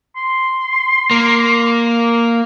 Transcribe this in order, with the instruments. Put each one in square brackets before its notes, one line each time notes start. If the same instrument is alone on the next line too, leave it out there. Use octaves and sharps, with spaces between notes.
[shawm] C6
[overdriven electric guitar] A#3